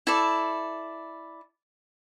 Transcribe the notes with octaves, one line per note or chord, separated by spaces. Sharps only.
E4 A4 D5